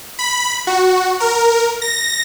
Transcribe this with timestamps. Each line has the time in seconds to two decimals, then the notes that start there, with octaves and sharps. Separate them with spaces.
0.19 B5
0.67 F#4
1.20 A#4
1.82 A#6